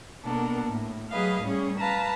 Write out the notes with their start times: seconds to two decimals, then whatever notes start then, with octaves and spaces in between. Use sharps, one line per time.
0.24 B2 A#3 B3 D4 A4 A#4
0.66 A2
1.11 F#3 A3 G#4 B4 D#5 F5
1.41 A2 G3 C#4 G#4
1.79 B4 F5 A5 A#5